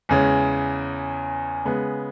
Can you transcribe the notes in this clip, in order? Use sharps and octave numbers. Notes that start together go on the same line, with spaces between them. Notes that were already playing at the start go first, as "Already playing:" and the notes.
E2 C#3 G#3 C#4
C#3 G#3 B3